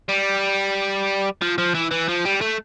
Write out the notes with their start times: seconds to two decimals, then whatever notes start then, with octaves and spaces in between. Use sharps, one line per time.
0.09 G3
1.42 F3
1.58 F3
1.74 E3
1.91 E3
2.08 F3
2.25 G3
2.41 A3